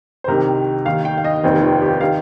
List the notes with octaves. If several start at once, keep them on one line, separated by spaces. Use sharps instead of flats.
C5
C2 C3 D#3 A#4
D#2 D#3 F5
G5
F5
D#5
F1 D#2 D#3 C4
F4
G4
D#3 F5